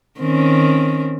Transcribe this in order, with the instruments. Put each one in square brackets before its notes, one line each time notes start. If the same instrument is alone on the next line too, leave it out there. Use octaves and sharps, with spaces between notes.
[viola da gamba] D#3 C4 C#4